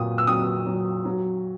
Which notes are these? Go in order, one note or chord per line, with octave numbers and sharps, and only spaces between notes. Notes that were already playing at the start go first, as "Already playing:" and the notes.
Already playing: A#2 F#3 D#6
E6
F#3 D#6
F#3
F#3